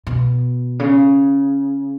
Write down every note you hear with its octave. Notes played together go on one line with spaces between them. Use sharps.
B2
C#3